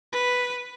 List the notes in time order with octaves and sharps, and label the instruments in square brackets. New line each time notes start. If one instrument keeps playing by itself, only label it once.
[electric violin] B4